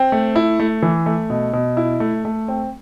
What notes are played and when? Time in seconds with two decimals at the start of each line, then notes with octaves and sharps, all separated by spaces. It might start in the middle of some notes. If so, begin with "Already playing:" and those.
Already playing: C4
0.12 A3
0.36 E4
0.60 A3
0.82 E3
1.06 A3
1.30 B2
1.53 B2
1.77 E4
2.00 A3
2.25 A3
2.48 C4